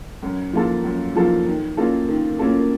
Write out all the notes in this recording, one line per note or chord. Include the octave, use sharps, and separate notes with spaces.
F#2
F3 A#3 F4 A4
F#2
F3 A#3 F4 A4
D#3
A#3 C#4 F4 A4
D#3
A#3 C#4 F4 A4